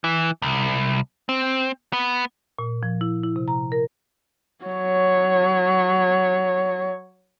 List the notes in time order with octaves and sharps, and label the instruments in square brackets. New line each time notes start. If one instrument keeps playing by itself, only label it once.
[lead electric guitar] E3
C2
C4
B3
[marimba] A#2
F3
E4
E4
C3
A#5
A#4
[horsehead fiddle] F#3 C#5